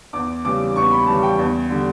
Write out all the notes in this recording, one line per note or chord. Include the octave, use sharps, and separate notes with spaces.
E2 D6
C#3 E3 G3 D6
E2 C#6
B5
C#3 E3 G3 A5
G5
E2
D3 G3